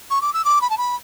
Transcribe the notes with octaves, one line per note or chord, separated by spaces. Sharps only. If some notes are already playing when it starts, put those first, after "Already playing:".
C#6
D6
E6
D6
B5
A5
B5